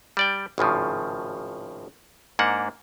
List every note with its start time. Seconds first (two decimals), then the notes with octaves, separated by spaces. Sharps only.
0.17 G3 D5 G5
0.58 G#1 A2 C#3 F3
2.39 G#2 A#3 D4 F#5